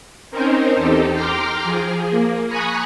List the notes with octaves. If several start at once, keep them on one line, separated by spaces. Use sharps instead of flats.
C4 C#4 D#4 A#4 C5
E2 D#4 G4 A4
G5 A#5 C6 D6 F6
F3 G#4
A#3
G#5 A#5 B5 C#6 D#6 F#6